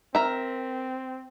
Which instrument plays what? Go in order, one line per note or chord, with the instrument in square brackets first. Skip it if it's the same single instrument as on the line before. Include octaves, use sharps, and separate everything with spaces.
[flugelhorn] C4 [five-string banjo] A#4 E5